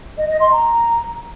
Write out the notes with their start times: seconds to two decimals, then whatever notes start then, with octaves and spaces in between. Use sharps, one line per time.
0.18 D#5
0.29 D#5
0.40 C6
0.52 A#5